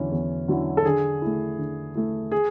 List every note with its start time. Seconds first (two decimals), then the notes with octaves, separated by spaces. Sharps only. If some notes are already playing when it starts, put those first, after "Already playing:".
Already playing: E2 D3 F#3 C#4 E4
0.12 E2
0.48 D3 F#3 C#4 E4
0.77 A4
0.85 D3 G#4
1.22 A3 E4
1.58 D3
1.95 A3 E4
2.32 G#4